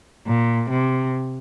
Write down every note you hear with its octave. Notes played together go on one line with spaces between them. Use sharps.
A#2
C3